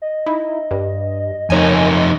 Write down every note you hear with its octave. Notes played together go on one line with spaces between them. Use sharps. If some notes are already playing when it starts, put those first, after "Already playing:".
D#5
D#4 E4
G2
F2 D#4 A#4 C#5 G#5